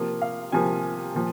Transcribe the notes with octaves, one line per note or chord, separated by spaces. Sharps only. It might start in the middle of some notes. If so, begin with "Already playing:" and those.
Already playing: C3 F3 A#3
F5
C3 F3 A#3 G#5
A#2 F3